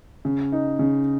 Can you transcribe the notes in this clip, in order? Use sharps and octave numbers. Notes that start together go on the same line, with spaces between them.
C#3
D#4
C#3